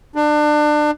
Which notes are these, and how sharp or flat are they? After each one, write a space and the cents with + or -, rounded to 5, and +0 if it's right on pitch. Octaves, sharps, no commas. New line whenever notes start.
D4 +30